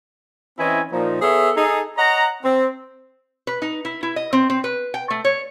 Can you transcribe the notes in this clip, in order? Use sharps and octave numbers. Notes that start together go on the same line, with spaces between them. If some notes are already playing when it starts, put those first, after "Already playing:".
E3 C4 C#4 E4 D#5 G#5
A#2 F3 D#4
B3 G#4 A4 C#5 E5
D#4 G#4 A4
C#5 D#5 F#5 A#5
C4
B4
D#4
E4
E4
D#5
C4
C4
B4
G5
A3
C#5